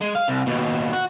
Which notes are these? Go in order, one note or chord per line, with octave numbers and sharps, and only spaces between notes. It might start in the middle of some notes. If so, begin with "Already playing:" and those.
G#3
F5
C2
D#2 B2
F#4